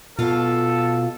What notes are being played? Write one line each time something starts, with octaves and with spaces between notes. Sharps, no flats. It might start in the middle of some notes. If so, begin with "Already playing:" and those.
B2 F4 A4 F5